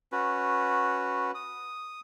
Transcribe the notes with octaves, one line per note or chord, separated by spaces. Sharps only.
C#4 F#4 B4
D#6